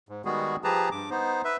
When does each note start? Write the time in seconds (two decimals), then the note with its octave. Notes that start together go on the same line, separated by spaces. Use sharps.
0.09 G#2
0.25 D#3 G3 G#3 B3 F#4 G#4
0.64 F3 G4 G#4 B4 A5 A#5
0.92 G2 D6
1.11 B3 D#4 C5
1.45 B4 E5